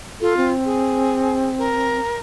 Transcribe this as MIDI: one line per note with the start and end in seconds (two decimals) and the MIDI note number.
0.21 0.51 65
0.21 0.34 69
0.37 2.00 60
0.65 1.47 68
1.58 2.19 70